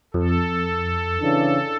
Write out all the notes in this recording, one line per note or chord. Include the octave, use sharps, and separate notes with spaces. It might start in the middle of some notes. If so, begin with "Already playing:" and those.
F2 A4
C#3 E3 D4